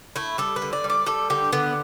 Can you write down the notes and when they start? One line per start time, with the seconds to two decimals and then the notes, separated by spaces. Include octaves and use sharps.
0.16 A3 E4
0.38 G3 A4
0.56 B4
0.62 D3
0.73 D5
0.84 G3
0.90 D5
1.06 G3 A4
1.30 D3 G4
1.52 D3 B3